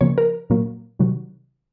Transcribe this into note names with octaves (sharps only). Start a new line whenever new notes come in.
C#3 F3 A#3 C#5
A#4
A#2 F#3 A#3
C3 D#3 F#3